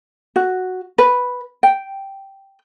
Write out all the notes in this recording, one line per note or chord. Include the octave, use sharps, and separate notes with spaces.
F#4
B4
G5